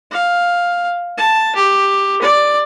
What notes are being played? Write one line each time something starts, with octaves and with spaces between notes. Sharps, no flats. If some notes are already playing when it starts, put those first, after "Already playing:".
F5
A5
G4
D5